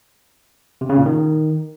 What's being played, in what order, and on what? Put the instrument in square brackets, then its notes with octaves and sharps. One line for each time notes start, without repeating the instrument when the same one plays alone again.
[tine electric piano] C3
C#3
A#2
D#3